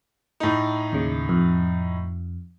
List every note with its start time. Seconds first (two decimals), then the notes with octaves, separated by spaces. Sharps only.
0.40 A2 D#4
0.92 D#2 C#3
1.29 F2